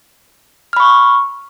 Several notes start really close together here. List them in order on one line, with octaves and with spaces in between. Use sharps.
F6 B5 C#6